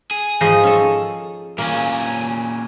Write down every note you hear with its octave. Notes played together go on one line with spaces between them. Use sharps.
G#4
G#2 F3 D#4
C#4 A4
A#2 A#3 C#4